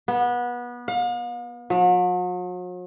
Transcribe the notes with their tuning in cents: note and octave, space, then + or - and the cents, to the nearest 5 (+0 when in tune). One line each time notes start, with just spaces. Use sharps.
B3 -25
F5 +45
F#3 -45